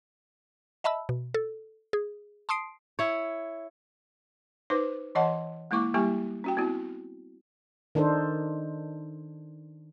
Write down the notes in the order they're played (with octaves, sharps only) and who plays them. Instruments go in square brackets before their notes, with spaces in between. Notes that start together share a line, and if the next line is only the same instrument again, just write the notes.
[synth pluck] D#5 E5 A5 B5 E6
B2
A4
G#4
A5 C6 D#6 C7 D7
[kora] E4 C#5
[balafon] D#4 B4 C5 D6
E3 C#5 D#5 F#5 A5 C6
G#3 A#3 E4 C#6 D6
G3 A#3 E4 G4 G#5 C#6
C#4 F#4 G5
B3 C4 E4 F#4
[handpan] D#3 D4 D#4 A4 C5